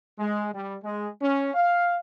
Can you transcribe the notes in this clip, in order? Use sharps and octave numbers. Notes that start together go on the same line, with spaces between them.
G#3
G3
G#3
C#4
F5